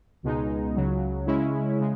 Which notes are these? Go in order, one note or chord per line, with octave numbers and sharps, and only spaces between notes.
C#2 B2 G#3 D#4
C#2 C#3 F#3
C#3 G#3 C#4 E4
C#3 G#3